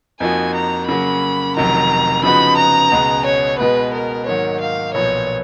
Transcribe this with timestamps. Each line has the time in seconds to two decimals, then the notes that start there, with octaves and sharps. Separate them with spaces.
0.20 F2 F3 A#3 D#4 F#4 G#5
0.55 A#5
0.88 C#3 F#3 A#3 B5
1.56 F1 F2 D#3 F#3 A#5
2.24 C#3 F3 B3 D#4 F#4 B5
2.57 A#5
2.91 C#2 B2 G#3 B3
3.26 C#5
3.59 B2 G#3 B3 B4
3.93 A#4
4.26 G#2 D#3 F#3 A#3 C#5
4.61 F5
4.94 B1 A#2 F3 B3 C#5